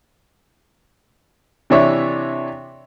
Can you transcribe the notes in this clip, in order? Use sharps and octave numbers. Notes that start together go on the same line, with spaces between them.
C3 E3 D4 C#5 D5 E5